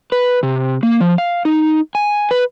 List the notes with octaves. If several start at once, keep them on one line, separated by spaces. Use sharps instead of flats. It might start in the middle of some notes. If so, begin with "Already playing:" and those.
B4
C3
A#3
F3
F5
D#4
G#5
B4